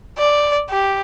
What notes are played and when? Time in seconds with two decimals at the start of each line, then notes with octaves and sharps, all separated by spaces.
0.18 D5
0.70 G4